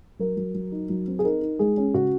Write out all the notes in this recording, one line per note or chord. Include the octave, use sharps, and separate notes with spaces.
F#3 A#4
F#3
F#3
D#4
F#3
C4
G#4
D#4 A#4
D#4
G#3 G#4
C#4
C#3 F#4